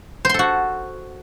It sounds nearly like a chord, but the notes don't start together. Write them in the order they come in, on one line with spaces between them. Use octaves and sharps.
C5 C6 A4 F#4